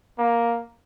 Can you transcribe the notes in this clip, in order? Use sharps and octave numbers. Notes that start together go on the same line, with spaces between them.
A#3